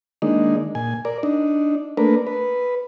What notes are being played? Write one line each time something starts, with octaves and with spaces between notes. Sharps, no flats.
D#3 G#3 A#3 D4 D#4
A#2 G#5
A#4 D5
D4 D#4
A3 A#3 D4 A#4 B4
B4